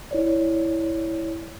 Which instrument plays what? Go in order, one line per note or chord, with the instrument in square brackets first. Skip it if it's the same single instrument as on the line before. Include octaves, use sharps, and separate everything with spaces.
[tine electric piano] E4 C#5 D5